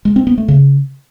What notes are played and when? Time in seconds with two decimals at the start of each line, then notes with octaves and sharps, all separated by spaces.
0.05 G#3
0.16 C4
0.27 B3
0.38 A3
0.48 C#3